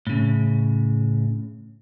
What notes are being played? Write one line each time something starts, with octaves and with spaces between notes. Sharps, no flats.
A2 C#3